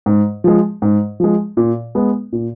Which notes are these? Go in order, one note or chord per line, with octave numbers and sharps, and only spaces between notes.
G#2
F3 G#3
G#2
F3 G#3
A#2
G#3 B3
A#2